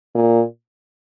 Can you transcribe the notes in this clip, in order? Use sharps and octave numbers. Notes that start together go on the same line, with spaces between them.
A#2